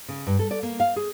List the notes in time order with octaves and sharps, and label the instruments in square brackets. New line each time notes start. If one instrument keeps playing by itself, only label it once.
[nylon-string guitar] C#3
G2
A4
D5
A#3
F5
G#4